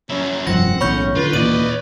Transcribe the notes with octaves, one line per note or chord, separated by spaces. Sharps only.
F#2 C#4 E4
F1 G2 F3 C4 F#5 A#6
B1 E2 A2 C#4 B5 C#6 G6
D3 F4 B4
D#2 A#2 E3 D5 D#5 D#7